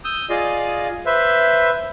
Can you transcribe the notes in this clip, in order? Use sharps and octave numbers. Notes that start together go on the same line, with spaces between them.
D#6 E6 G6
F4 G#4 D5 D#5 F5
B4 C5 E5